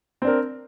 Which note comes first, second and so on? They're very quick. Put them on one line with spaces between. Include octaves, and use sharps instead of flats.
C4 D4 A#4